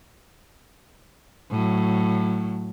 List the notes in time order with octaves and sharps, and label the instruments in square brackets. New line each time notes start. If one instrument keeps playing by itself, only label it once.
[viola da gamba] A2 F#3